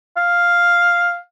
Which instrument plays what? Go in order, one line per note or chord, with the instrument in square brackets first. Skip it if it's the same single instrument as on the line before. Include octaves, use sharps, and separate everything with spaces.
[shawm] F5